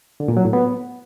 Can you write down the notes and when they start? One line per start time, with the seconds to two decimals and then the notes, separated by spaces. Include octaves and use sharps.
0.20 D3
0.28 A#2
0.37 F#3
0.45 A2
0.53 B3